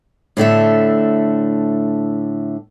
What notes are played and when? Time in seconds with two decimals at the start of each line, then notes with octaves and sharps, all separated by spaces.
0.37 A2 D3 A3 E5